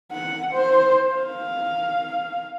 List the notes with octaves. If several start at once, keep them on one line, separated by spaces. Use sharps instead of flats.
F#5
C5
F5